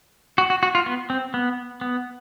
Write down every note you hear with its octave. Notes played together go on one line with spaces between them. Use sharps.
F#4
F#4
F#4
F4
B3
C4
B3
B3